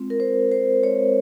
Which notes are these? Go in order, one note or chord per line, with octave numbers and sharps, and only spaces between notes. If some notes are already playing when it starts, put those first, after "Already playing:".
Already playing: G#3 C4 F4
A#4
C5
C5
G#3 C4 F4 C#5